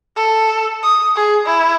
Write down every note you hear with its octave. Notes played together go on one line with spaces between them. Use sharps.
A4
D#6
G#4
E4